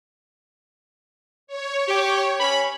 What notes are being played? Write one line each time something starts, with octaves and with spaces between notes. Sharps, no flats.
C#5
G4
C#4 B5